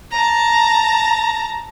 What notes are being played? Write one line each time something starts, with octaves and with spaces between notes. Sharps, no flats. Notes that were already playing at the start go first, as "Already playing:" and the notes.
A5 A#5